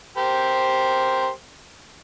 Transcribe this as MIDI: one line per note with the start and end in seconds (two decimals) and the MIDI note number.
0.17 1.29 67
0.17 1.29 70
0.17 1.29 72